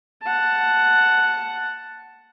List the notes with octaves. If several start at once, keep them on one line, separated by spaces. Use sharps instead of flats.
F#5 A5